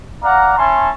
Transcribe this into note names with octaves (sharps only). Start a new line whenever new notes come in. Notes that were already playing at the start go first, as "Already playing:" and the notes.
D5 F5 F#5 A#5
C#4 E4 A5 C6 C#6